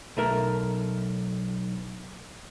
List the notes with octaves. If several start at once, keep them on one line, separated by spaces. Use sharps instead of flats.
B1 A3 A#4